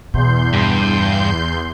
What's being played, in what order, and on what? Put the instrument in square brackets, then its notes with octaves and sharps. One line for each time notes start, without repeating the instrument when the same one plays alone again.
[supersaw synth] E2 C6 G6 [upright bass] B2
[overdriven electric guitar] G2